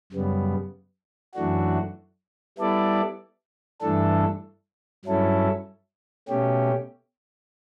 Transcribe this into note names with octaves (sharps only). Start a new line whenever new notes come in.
F#2 C#3 G3 B3
F#2 E3 A3 D4 F#4
G3 B3 E4 A4 D5
G2 E3 A3 D4 A4
G2 F#3 C#4 E4 A4
B2 A3 C#4 G4